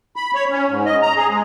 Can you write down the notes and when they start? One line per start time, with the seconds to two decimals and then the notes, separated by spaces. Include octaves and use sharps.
0.16 B5
0.34 C#5
0.50 C#4
0.68 G#2
0.86 D#5
1.02 A#5
1.17 G#4
1.29 G#3